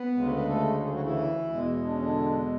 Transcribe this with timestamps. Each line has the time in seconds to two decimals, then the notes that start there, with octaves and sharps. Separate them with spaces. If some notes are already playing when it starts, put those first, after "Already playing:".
Already playing: B3 B4
0.14 D2 C#3 G#3
0.36 B4
0.47 A3 A4
0.81 G#3 G#4
0.92 F#3 F#4
1.04 E3 E4
1.50 E2 B2 G#3
1.84 D4
1.92 C#4
2.00 D3 D4